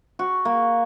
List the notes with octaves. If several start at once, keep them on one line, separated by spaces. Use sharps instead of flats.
F#4
A#3